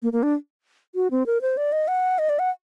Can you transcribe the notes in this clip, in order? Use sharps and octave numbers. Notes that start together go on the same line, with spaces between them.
A#3
A#3
D4
F#4
C4
A#4
C5
D5
D#5
F#5
D#5
D5
F#5